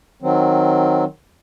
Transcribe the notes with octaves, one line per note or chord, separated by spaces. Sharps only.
D#3 F#3 C4